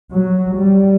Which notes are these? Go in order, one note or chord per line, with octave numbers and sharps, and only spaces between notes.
F#3
G3